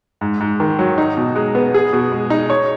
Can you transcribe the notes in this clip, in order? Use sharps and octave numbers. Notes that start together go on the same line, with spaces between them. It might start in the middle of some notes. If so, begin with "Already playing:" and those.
G#2
G#2
D#3
F#3
D#4
B2
G#3
B3
G#4
B2
G#3
D#4
C#5